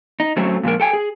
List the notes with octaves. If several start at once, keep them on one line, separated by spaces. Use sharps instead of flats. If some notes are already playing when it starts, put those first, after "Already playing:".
D#4
F#3 A3 C4 C#4
A#2 F3 G#3 A#4
A4 G5 G#5
G#4